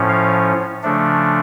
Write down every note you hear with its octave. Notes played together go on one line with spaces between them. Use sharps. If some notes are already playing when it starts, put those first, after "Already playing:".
Already playing: A2 F3 C#4
F5
C#3 F3 A3 D4